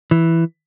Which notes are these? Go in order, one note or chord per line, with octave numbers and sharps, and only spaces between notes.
E3